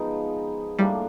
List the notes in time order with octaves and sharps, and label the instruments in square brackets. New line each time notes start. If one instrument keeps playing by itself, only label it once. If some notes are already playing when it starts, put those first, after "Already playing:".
Already playing: [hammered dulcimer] F3 G#3 B3 D#4
[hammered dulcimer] A2 F3 A#3 D4 [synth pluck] G3